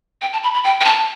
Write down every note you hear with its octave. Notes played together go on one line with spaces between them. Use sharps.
G5
A5
B5
B5
G5
G5
A5